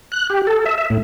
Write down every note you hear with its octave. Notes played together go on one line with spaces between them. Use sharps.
F#6
G4
A4
E5
E5
A2